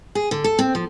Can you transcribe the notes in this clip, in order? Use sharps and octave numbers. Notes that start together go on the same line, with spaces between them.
G#4
D3
A4
C4
F3